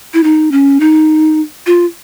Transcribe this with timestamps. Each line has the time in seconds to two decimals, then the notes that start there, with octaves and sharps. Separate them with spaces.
0.14 E4
0.24 D#4
0.52 C#4
0.80 D#4
1.67 F4